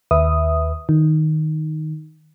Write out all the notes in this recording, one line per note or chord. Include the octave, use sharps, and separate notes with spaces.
D#2 B4 E5 D#6
D#3